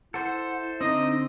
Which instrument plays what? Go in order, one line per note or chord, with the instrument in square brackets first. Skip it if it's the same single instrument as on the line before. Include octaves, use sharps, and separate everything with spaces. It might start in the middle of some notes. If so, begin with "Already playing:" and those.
[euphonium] E4 [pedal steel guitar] A4 C5 [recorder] F#5
[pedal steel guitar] D3 C4 [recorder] D#4 [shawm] D#5